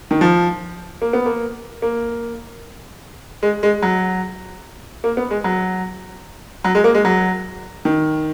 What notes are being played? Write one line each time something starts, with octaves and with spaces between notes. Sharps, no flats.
D#3
F3
A#3
B3
A#3
A#3
G#3
G#3
F#3
A#3
B3
G#3
F#3
F#3
G#3
A#3
G#3
F#3
D#3